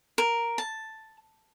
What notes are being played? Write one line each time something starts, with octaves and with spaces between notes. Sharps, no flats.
A#4
A5